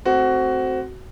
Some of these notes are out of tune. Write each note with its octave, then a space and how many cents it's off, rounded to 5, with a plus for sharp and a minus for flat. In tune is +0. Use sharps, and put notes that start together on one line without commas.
A3 +0 C4 +0 F#4 +15